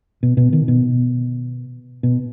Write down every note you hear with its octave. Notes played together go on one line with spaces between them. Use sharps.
B2
B2
D#3
B2
B2